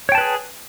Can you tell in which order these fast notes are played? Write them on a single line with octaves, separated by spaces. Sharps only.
C#5 G5 A5 B4 G#4